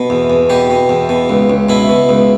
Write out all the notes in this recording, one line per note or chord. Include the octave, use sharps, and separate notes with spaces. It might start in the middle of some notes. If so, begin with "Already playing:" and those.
Already playing: B2
E2
E2
B2 G4
B2
E2
B2
C#2
C#2
B2 E4
B2
C#2